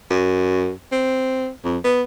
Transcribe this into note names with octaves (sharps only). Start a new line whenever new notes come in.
F#2
C4
F2
B3